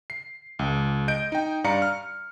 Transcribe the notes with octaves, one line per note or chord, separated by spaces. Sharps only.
C7
C#2
D#5 G6 D7
D#4 G5
G2 D5 F5 A#5 C#7
F6